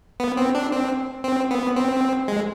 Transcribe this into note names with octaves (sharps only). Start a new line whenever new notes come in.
B3
C4
D4
C4
C4
B3
C4
G#3